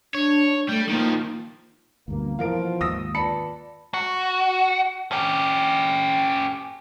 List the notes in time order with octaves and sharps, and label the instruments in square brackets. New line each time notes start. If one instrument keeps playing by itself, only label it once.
[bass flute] D4 [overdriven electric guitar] C#5
[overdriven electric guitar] G3 [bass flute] A3
[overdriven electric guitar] D#3 F3 [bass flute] A#3
[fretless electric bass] D2 G2 B2 [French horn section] A#3
[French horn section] B2 F3 [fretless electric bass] E3 [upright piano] F4 A#4 D7
[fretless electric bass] D#2 G#2 [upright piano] D#6 E6 A#6
[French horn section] F4 B4 D5 [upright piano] A5 B5 C#7
[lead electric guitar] F#4
C#4 G4